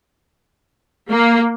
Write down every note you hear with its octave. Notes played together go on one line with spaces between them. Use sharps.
A#3